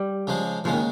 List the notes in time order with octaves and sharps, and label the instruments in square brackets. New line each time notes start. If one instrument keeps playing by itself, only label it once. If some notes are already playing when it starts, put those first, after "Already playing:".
Already playing: [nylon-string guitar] G3
[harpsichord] C#3 F3 G#3
[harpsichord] D#2 C#3 G#3 [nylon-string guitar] F3
[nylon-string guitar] D#3